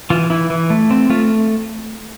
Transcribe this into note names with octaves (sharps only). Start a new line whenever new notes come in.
E3 F4
E3 E4
E3
A3
C4
A3 F4